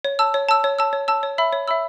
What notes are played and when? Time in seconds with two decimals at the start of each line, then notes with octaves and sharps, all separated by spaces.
0.05 C#5
0.19 A5 E6
0.34 C#5
0.49 A5 E6
0.64 C#5
0.79 A5 E6
0.93 C#5
1.08 A5 E6
1.23 C#5
1.38 E5 B5 E6
1.53 C#5
1.68 E5 B5 E6